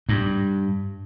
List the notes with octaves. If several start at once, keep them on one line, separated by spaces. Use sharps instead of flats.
G2